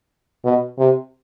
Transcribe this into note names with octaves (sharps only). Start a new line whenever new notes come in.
B2
C3